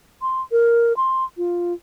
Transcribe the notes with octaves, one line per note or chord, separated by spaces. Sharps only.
C6
A#4
C6
F4